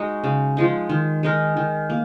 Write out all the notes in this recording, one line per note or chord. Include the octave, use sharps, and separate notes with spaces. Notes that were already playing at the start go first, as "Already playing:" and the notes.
Already playing: G#3 D#4 F#4
C#3
F3 G#3 D#4
D#3
G#3 D#4 A#4
D#3
A#3